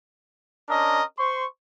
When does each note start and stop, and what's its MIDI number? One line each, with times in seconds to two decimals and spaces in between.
0.69 1.02 61
0.69 1.02 62
0.69 1.02 70
0.69 1.02 75
1.19 1.45 72
1.19 1.45 84
1.19 1.45 85